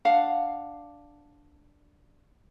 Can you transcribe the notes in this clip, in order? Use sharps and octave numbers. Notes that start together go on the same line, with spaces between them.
D4 F5 F#5